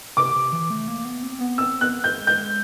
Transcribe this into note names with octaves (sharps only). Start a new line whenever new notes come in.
C3 D6
C3
E3
A3
A#3
B3
C4
B3
C4 E6
B3 F#6
G#3 G6
G6